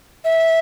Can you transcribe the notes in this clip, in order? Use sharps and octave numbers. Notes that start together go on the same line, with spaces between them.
E5